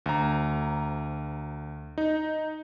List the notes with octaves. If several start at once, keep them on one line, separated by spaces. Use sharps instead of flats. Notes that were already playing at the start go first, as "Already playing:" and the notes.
D2 A#5
D#4